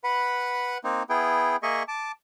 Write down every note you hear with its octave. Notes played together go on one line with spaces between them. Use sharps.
B4 F#5 B5
A#3 C4 D#4
B3 E4 G#4 G5
A#3 G#4 D#5 E5 C#6
A5 D6